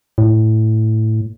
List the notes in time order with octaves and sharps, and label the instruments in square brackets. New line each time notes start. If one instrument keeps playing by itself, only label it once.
[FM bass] A2